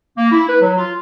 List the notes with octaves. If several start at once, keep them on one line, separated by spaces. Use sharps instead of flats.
A#3
E4
B4
F#3
F4